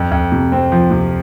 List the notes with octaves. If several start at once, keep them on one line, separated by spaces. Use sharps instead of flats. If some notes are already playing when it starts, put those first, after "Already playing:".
Already playing: F2
F2
C3
C4
F3
C3